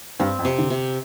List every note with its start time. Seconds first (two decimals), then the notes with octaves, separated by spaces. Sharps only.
0.20 G2 C4
0.39 F2
0.45 C3
0.58 D3
0.70 C3